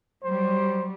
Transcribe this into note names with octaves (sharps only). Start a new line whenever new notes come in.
F#3 G3 C5